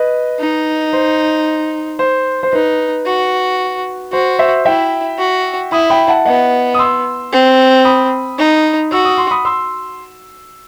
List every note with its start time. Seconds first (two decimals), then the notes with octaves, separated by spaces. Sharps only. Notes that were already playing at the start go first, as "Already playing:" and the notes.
Already playing: B4 D#5
0.40 D#4
0.93 C5
1.99 C5
2.43 C5
2.53 D#4 B4
3.06 F#4
4.12 F#4 C5
4.39 C5 E5
4.65 E4 E5 G5
5.19 F#4
5.72 E4 B5 D#6
5.90 G5 B5
6.08 F#5 A5
6.25 B3 D#5 F#5
6.74 D#6
6.79 C6 E6
7.32 C4
7.85 B5 D#6
8.38 D#4
8.92 F#4 E6
9.05 D#6
9.18 C6
9.31 B5 D#6
9.45 C6 E6